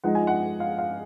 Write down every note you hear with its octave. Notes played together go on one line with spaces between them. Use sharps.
F3 G#3 D#4 F#5
G#5
F#5
F5
F5